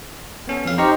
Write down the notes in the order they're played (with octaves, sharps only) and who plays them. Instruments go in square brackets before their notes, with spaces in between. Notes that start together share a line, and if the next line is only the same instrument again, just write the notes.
[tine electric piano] B3 C#4 A4
F2 F5
[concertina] D#4 G4 [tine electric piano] C5 A#5 C#6